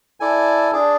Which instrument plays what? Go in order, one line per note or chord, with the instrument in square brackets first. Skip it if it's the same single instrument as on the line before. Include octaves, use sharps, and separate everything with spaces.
[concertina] E4 A4 D5 G#5
D4 G#4 D5